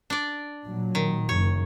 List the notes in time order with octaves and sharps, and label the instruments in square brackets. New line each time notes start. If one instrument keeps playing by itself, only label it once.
[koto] D4 D5
[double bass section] A#2 F#3
[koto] D#3
[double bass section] F#1 [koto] C#5